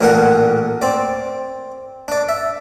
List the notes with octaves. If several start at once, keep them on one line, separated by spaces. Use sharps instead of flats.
A1 A#2 A#3 D4 A#4 F#5
C4 D5
D4 D5
E5